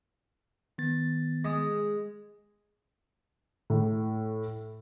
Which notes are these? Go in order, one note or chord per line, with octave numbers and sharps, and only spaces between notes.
D#3 B3 A6
G#3 D#6
A2